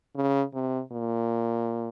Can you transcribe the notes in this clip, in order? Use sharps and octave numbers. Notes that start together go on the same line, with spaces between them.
C#3
C3
A#2